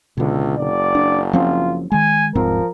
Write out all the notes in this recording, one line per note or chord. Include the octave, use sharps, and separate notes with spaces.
C#2 B2 D3
F#1 D5
D4
F3 C4 C#4 F4
D#3 G#3 G#5
D#1 G#2 F3 C4 A#4